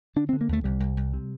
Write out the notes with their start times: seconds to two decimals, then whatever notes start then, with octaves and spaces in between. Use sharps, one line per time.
0.16 D3 D4
0.29 C4
0.33 D3
0.41 A#3
0.49 D#2 A3
0.64 C2 G3
0.80 C2
0.97 C2
1.13 C3